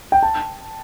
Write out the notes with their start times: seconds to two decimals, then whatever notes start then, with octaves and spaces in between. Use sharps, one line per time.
0.12 G5
0.23 A5